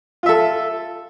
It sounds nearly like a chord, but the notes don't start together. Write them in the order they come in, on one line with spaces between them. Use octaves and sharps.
F4 E5 A4